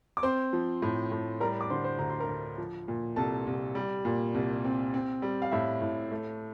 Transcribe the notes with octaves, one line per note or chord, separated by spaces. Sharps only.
D6
C4 C5 C6
F3
A2
A2
G3 A#4 A#5
D6
D3 C5 C6
C5 C6
D2 A#5
C6
A#4 A#5
D2
F3
A#2
C2 A4 A5
C2
G3
A#2
C2
C4
C4
G3
F5
A2 E4 E5
A2
A3